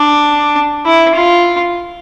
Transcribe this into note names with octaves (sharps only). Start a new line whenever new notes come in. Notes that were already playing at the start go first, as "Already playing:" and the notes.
Already playing: D4
E4
F4